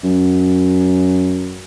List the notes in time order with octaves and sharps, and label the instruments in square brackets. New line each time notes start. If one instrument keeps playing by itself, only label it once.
[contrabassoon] F#2